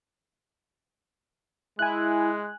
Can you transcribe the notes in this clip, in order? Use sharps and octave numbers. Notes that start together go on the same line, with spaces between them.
G#3 E4 G#5 F#6